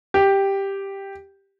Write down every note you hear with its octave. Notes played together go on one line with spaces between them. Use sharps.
G4